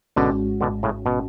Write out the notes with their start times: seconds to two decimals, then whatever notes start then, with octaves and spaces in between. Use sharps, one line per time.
0.16 G#1 G#2 B2 D3 G#3 C#4 F#4
0.61 B2 D3
0.83 A2 C#3
1.06 B2